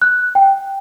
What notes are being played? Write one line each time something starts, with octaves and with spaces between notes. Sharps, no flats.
F#6
G5